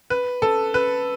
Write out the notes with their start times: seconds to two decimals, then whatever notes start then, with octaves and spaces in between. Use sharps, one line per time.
0.10 B4
0.42 A4
0.74 B4